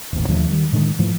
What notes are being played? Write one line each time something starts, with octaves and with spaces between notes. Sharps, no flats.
D#1 A1
D#2 D3 F3 A3
D#3 G3
A2 D3 D#3 G#3
G#2 E3 F3 A3